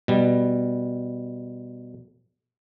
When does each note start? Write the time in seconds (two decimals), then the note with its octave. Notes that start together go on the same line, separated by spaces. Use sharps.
0.08 B2 G3